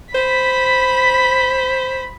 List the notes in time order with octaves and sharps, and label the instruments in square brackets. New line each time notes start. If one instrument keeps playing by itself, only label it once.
[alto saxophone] C5 [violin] B5 B6